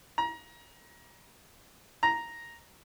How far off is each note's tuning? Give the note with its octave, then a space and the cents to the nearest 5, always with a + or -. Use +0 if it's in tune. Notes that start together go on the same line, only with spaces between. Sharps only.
A#5 +25
A#5 +0